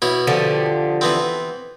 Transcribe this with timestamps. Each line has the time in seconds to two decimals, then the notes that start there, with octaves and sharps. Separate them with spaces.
0.02 B2 E4 C#5
0.27 D3 F3 G4
1.01 E3 B3 C4